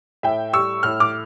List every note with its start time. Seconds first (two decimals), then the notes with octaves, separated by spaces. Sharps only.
0.23 A2 E5 G5
0.53 G3 C#6 E6
0.83 A2 F6
1.00 D6 F6